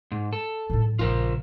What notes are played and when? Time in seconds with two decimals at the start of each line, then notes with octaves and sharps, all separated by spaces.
0.12 G#2
0.33 A4
0.70 A2 G3
0.99 A#1 C#3 F4 A#4 C5